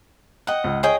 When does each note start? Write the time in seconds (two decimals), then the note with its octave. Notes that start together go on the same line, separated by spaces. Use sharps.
0.47 D#5 F#5 G5 F#6
0.64 C#2
0.83 G#4 C#5 D#5 G5